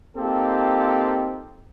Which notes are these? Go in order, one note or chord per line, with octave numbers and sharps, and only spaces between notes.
A#3 C4 D#4 F4 G4 A4